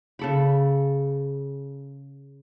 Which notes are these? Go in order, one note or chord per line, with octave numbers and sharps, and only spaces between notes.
C#3 A4 B5